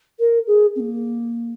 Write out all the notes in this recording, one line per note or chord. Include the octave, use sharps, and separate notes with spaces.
A#4
G#4
C4
A#3